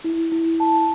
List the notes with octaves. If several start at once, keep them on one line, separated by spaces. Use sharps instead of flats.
E4
E4
A5